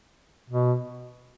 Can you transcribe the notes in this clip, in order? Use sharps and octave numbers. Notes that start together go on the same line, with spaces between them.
B2